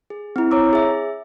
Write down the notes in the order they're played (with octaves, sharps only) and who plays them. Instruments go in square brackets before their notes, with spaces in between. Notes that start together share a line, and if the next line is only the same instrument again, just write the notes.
[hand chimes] G#4
C4 E4
C#5 A#5 D6 E6
G#4 E5